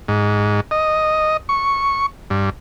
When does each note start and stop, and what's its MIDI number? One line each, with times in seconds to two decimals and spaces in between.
0.08 0.61 44
0.71 1.37 75
1.49 2.06 85
2.30 2.50 43